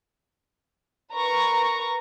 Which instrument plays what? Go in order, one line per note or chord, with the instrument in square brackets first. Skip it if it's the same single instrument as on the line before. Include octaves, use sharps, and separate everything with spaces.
[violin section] A#4 B4 A#5 C#6